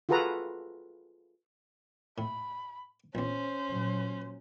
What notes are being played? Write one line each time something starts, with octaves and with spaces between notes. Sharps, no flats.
F4 F#4 G#4 A4 B4 A#5
A2 B5
A#1 E2 C#4 C5
A#2 F#3